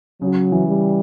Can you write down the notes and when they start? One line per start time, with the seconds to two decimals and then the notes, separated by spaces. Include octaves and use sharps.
0.22 C#3 F#3
0.52 E3
0.68 G3